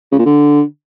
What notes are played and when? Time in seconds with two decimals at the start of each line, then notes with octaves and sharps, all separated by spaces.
0.12 C#3
0.19 A#2
0.26 D3